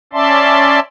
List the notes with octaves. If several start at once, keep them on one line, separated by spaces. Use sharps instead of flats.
C#4 D5 E5 A5 C6